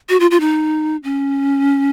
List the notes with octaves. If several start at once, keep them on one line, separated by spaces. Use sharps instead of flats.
F#4
F4
F4
D#4
C#4